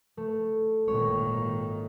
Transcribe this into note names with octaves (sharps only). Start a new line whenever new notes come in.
A3
G#1 A#2 D#3 C#5